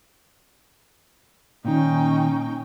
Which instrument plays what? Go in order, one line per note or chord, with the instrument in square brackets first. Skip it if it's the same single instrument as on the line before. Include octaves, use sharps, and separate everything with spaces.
[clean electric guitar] A#2 D#3 [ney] C#4 [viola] D#4 G5